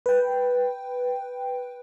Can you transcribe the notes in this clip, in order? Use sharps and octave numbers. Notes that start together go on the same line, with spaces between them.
B4 G5